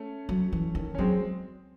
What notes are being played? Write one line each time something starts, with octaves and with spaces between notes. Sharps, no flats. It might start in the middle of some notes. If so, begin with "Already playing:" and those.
Already playing: A3 C#4
F#3
E3
D#3
C#4
F#3 G#3 C4